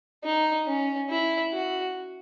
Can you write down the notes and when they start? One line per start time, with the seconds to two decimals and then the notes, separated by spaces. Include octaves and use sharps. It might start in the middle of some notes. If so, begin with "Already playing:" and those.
0.24 D#4
0.67 C#4
1.10 E4
1.53 F#4